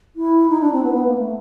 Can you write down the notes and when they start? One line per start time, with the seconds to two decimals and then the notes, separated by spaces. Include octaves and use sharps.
0.16 E4
0.50 D#4
0.61 D4
0.72 C4
0.83 B3
0.94 B3
1.06 A#3
1.17 A3